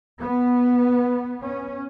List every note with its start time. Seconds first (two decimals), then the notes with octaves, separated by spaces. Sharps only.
0.20 B3
1.41 C#4